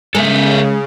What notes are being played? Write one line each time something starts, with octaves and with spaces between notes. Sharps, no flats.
C#3 G#3 A4 A#4 E5